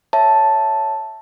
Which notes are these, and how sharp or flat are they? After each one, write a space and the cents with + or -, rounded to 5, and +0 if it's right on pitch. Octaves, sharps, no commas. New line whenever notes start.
C#5 +0 E5 +0 A5 +0